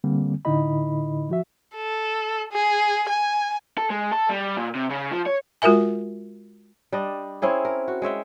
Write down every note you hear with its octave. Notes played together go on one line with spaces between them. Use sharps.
D3 G3 A#3 C4
A2 D3 D#4 E4 D#5 B5
F3 F#4 E5
A4
G#4
G#5
A4
G#3
A4
G3
A#2
C3
C#3
F3
C#5
G#3 F4 F#4 A#4 E5 G#5
G3 D4 D#5
C4 C#4 E4 G#4
A#4
F#4
G#3 C#5 E5 G5